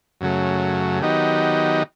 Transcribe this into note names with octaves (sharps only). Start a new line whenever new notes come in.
F#2 C#3 F#3 A3
D#3 F#3 B3 D#4 G4